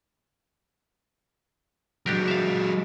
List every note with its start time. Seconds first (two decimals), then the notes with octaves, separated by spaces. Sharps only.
2.06 F#3 G#3 D4 G4 A#4
2.28 E5 F5